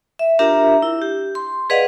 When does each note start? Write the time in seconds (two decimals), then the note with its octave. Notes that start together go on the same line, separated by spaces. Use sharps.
0.19 E5
0.39 D4 F4 G4 A#4 E5 A#5
0.82 E4
1.02 G4
1.35 C6
1.70 G#4 B4 D5 D#5 F5 F#5